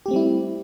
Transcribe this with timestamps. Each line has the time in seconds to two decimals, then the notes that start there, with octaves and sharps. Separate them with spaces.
0.06 G4
0.08 A3
0.11 C4
0.13 G3
0.16 E4